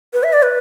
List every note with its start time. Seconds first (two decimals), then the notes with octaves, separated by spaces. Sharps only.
0.13 B4
0.23 E5
0.33 D5
0.43 B4